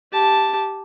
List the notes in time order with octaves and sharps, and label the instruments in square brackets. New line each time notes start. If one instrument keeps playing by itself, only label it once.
[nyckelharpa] G4 A5